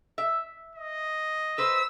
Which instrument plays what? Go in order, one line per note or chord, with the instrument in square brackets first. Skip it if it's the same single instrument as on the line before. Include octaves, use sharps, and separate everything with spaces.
[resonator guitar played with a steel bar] E5
[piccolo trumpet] D#5
[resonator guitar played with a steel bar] B4 C5 [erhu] E6